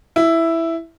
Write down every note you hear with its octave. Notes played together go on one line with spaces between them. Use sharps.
E4